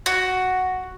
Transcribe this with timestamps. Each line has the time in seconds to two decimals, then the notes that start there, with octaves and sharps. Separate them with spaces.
0.06 F#4